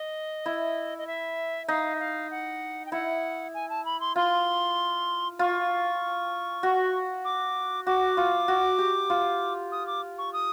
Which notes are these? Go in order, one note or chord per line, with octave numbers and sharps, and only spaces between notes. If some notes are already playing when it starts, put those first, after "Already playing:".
Already playing: D#5
E4
D#5
E5
D#4 F5
E5
F5
F#5
G5
E4 F#5
G#5
A5
B5
C6
F4 C6
F4 C#6
F#4
D6
F#4 D6
F4
F#4
G4
F4
D#6
D6
C#6
D#6